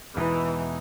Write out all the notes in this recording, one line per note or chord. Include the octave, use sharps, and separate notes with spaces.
E2 B2 E3 G#3 D#4